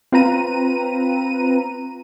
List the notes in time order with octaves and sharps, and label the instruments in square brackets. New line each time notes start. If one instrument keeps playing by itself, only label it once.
[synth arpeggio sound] C4 F4 B4 A#5 D#7